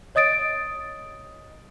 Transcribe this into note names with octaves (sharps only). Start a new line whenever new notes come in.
C#5 D#5 D#6 A6 D7